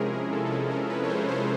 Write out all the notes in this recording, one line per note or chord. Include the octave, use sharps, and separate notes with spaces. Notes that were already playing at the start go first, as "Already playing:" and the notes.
Already playing: C3 F3 G#3 C#4 E4 G#4 A#4
A#4
A4
A4
G#4
A#4
B4
C#5
C5
C5